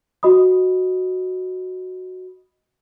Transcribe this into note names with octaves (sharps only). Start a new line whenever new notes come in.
F#4 D#5 B5 D#6